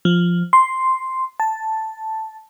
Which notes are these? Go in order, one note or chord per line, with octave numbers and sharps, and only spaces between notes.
F3
C6
A5